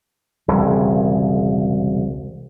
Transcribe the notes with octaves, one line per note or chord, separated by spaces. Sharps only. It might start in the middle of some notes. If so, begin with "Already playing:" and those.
E1 C2 C#3